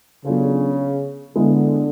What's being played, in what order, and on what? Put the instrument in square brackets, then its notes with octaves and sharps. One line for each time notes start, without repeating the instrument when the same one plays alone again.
[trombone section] C#3 [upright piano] F#3 B3 D4 F4 A4
[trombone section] D3 [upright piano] G#3 B3 E4